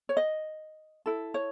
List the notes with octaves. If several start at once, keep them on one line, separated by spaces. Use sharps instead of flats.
C#5
D#5
E4 A4
C#5